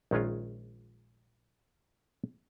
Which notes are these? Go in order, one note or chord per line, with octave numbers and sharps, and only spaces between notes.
A#1 D#3 G#3 C#4 F4